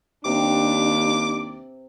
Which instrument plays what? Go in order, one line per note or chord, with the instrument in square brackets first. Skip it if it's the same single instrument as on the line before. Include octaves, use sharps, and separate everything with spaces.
[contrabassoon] D#2 [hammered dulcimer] C3 [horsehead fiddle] D4 [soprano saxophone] D6